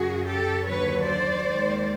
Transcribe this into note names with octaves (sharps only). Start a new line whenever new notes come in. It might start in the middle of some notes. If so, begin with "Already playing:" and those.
Already playing: F#2 C#3 F#3 F#4 G#4
G4 A4
D#2 D3 F#3 B4 C#5
C5 D5
D#2 D#3 G#3